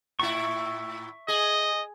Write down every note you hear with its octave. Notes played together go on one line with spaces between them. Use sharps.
A2 E4 E5 C#6
G#4 D#5